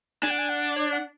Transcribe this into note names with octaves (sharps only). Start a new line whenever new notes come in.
D4 G#5
F#5
G#5
F#5
C#5
F#5